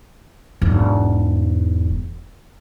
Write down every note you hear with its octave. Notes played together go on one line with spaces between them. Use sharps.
E1 G#2